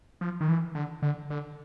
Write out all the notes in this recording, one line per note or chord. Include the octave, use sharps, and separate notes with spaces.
F3
D#3
E3
D3
D3
D3